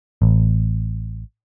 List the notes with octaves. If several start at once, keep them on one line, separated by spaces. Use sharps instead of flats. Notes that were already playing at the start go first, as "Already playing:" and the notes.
A1